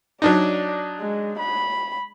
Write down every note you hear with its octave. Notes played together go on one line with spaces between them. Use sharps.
F#3 D4 D#4 D5
G#3
B5